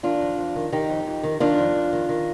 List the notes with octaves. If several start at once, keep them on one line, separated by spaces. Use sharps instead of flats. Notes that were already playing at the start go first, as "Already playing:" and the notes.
D#3 D4 F4
F2
F2
D#3
D#3 D#4 G4
F2
F2
D#3
D#3 D4 F4
F2
F2
D#3
D#3